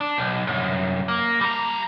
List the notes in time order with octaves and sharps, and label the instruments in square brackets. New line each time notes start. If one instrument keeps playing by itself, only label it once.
[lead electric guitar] D4
B1
C2 F#2
A#3
G3 A#5